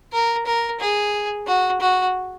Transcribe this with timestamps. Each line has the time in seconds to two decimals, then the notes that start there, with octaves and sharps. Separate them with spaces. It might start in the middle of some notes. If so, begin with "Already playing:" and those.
0.13 A#4
0.46 A#4
0.80 G#4
1.47 F#4
1.81 F#4